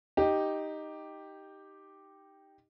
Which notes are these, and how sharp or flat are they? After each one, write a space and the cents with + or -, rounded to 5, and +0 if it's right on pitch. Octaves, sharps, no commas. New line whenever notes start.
D#4 +0 G4 +0